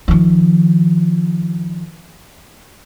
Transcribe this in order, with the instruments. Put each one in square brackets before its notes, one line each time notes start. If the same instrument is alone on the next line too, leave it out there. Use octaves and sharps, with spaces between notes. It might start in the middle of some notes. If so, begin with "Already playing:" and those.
[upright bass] D#3 F3